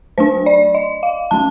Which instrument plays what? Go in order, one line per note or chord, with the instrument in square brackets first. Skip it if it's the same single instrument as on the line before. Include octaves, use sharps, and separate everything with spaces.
[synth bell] F#3 A3 D4 C5
D5
D#5
F5
F#3 A3 C#4 A5